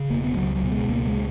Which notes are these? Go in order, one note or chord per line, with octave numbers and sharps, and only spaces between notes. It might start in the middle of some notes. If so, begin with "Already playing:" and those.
Already playing: C#3
E1 A#3
B3
C#2 F#3
F#3
B2
G#3
C#2 A#3
G#3
B2